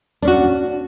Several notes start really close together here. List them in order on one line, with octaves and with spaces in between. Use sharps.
D4 C#4 F#4